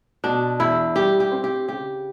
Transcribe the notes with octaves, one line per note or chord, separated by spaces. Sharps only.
B2 D4
E2 E4
G3 G4
G4
C4
G4
C#3 G4